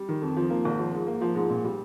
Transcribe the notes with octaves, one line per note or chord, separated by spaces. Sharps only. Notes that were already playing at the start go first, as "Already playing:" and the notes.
Already playing: G3
D#3
F2
F3
A#3
G#1
F3
G#2
A#3
F3
G#2
A#2
G3